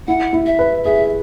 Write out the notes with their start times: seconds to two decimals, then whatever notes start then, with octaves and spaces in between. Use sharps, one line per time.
0.08 E4 F#5
0.33 E4
0.46 E5
0.59 B4
0.85 G#4 E5